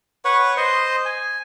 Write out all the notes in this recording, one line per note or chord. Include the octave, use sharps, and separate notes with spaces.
B4 C#5 F#5 C#6
C5 D#5 C6
G#5